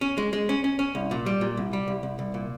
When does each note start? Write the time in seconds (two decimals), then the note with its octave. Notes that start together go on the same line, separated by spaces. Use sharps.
0.01 C#4
0.18 G#3
0.33 G#3
0.49 C#4
0.64 C#4
0.79 C#4
0.95 C2
1.11 A#2
1.26 G3
1.41 A#2
1.57 C2
1.73 G3
1.88 C2
2.03 C2
2.19 C2
2.34 A#2